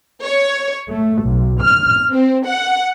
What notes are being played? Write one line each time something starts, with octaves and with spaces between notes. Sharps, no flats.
C#5
A3
B1
F6
C4
F#5